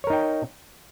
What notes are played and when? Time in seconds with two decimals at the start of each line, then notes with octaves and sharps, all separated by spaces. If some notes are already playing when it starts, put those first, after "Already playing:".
0.04 C#5
0.07 A#4
0.10 D#4
0.13 G5